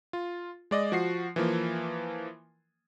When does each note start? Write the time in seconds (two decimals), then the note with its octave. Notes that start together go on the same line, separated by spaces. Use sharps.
0.13 F4
0.71 G#3 D5 D#5
0.92 F3 F#4 C7
1.36 E3 F3 A#3